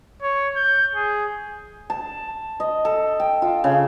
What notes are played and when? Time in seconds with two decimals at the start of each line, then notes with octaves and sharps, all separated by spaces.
0.22 C#5
0.56 G6
0.95 G#4
1.90 A5
2.60 D#5
2.85 A4
3.20 G5
3.42 F4
3.64 C#3